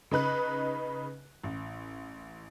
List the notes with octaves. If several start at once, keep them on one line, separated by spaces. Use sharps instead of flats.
C#3 D#4 B4 F#6
A1